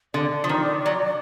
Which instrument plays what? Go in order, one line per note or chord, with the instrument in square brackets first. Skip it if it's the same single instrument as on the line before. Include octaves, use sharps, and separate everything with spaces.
[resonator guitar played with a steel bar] D3 [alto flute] D5
[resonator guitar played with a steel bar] F3
D#3
F#3